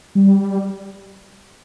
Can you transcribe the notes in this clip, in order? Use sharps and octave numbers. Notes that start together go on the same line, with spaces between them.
G3